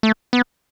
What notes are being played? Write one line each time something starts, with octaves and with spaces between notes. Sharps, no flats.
A3
B3